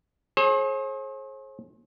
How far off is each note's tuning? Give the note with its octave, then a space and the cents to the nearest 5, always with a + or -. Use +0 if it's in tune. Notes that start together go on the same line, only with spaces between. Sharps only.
G#4 +35 C5 +45